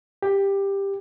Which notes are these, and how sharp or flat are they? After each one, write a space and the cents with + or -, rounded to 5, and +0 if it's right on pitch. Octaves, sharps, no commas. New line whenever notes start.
G4 +10